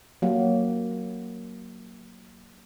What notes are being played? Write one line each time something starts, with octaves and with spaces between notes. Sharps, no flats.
F#3 A#3